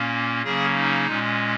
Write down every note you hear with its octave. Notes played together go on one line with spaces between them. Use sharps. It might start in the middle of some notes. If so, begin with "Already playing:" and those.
Already playing: A#2 A#3 C#4
C#3 F#3 A#3 C#4 G#4
D#4
A#2 G#3 C#4